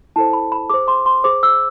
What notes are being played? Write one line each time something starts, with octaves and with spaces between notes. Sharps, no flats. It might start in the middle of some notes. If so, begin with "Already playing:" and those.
E4 A4 C5 A5
B5
B5
G#4 C5 D6
C6
C6
G#4 C5 D6
E6